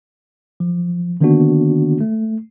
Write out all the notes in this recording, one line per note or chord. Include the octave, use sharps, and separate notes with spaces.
F3
D3 D#3 A#3 B3 D4 F#4
A3